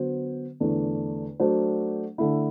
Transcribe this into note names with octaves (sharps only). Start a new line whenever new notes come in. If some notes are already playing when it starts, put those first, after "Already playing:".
Already playing: D3 F#3 B3 F#4 C5
E2 D3 A3 D4
F#3 A3 D4 F#4 C5
D3 A3 E4